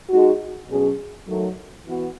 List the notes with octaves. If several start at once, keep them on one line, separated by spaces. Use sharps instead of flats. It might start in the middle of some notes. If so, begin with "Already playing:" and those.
G#3 D#4 F#4
B2 F#3 C#4 G#4
D#3 F#3 A3
E3 B3 F#4